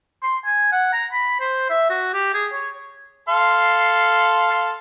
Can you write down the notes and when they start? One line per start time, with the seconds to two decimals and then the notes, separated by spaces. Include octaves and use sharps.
0.23 C6
0.45 G#5
0.72 F#5
0.93 A#5
1.12 B5
1.40 C5
1.70 E5
1.90 F#4
2.13 G4
2.34 G#4
2.53 C#5
3.29 A4 F5 C6